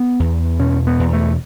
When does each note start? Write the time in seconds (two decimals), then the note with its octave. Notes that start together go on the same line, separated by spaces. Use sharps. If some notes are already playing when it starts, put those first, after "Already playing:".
Already playing: B3
0.20 E2
0.59 B2 C#4
0.87 B3
0.99 E2
1.13 A3